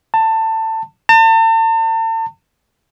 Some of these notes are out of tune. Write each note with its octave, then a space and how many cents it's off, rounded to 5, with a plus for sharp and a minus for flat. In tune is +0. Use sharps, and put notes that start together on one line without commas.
A5 +20
A5 +40